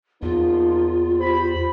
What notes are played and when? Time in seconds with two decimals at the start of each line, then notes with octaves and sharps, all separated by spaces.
0.23 E2 F3 A#3 D#4 F4
1.20 G4 C5 B5